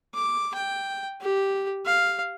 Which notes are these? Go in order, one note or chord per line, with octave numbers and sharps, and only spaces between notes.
D6
G5
G4
F5